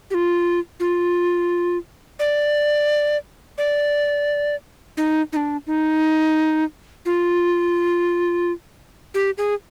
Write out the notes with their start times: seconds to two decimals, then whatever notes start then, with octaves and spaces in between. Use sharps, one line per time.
0.11 G4
0.14 F4
0.80 F4
2.19 D5
3.58 D5
4.97 D#4
5.33 D#4
5.36 D4
5.67 D#4
7.06 F4
9.14 G4
9.38 G#4